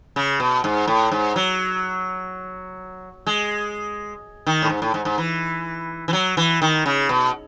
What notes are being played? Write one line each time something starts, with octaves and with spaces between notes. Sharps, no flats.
C#3
B2
G#2
A2
G#2
F#3
G#3
D#3
A2
G#2
A2
G#2
G#2
E3
E3
F#3
E3
D#3
C#3
B2